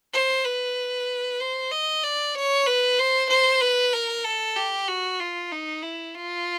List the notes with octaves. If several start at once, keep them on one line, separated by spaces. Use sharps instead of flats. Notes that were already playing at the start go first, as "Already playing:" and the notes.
C5
B4
C5
D#5
D5
C#5
B4
C5
C5
B4
A#4
A4
G4
F#4
F4
D#4
E4
F4